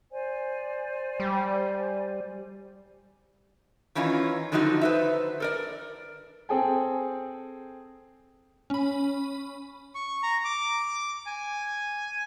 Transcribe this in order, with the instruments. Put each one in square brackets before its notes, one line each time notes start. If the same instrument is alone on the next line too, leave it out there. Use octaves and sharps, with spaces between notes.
[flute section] C5 D5 G#5
[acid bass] G3
[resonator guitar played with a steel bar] D#3 E3 C#4 D#4 F4
D3 D#3 F3 F#3 D#4 F#4
B4 C5 E5
A4 A#4 D5
[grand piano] C4 G#4 A4 G5 G#5
[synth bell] C#4 B5
[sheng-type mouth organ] C#6
A#5
D6
G#5